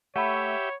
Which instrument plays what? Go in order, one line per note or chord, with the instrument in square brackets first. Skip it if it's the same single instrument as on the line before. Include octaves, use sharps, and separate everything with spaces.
[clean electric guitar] A3 [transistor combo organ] G4 E5 [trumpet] C#5 [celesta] F#5 B5